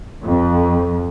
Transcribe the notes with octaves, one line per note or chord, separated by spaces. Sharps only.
F2